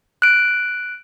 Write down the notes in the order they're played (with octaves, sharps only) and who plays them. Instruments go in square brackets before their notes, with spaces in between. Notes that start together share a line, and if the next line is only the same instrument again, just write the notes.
[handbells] F#6 D7